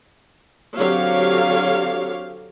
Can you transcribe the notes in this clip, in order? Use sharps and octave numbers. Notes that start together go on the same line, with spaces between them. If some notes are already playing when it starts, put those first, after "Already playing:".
D3 F#3 C4 G4 C#5 F5